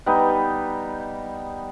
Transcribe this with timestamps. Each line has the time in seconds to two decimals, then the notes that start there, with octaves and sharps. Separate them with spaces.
0.06 G3 B3 D#4